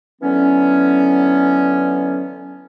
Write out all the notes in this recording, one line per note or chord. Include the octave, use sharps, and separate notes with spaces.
D3 E3 F#3 B3 C#4